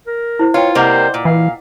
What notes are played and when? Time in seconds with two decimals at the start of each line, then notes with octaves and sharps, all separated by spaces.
0.07 A#4
0.39 E4 C5
0.54 F4 B4 C#5 G5
0.75 C3 G3 A#3 C5 D#5 F#5
1.14 A#2
1.25 E3 F5